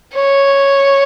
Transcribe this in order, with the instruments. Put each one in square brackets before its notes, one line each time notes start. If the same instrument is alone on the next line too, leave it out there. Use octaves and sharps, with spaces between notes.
[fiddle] C#5